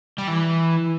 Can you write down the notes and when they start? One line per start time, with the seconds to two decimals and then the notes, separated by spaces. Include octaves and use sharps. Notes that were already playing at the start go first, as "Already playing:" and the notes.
0.18 G3
0.28 E3